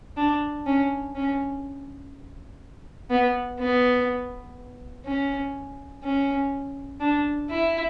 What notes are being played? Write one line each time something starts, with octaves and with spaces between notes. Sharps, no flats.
D4
C#4
C#4
B3
B3
C#4
C#4
D4
E4